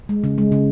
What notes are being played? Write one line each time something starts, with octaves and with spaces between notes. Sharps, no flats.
G#3
C#3
G#3
C#3